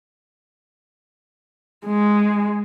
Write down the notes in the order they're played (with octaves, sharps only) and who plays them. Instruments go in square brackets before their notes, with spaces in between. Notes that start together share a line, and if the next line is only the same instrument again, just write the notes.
[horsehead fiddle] G#3